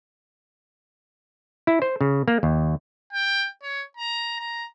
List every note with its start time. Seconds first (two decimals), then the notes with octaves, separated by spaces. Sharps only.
1.67 E4
1.82 C5
2.01 C#3
2.28 A#3
2.43 D#2
3.13 G5
3.63 C#5
3.97 A#5
4.39 A#5